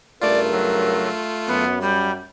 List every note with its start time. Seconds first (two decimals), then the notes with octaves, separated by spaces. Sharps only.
0.21 G2 C#3 A3 F4 A#4 D5
0.50 F#3
1.47 F#2 B3
1.81 G3